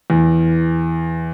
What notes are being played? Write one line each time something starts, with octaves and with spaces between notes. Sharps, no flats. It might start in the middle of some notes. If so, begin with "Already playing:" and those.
E2